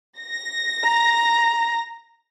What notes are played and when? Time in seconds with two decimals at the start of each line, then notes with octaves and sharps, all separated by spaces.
0.19 A#6
0.84 A#5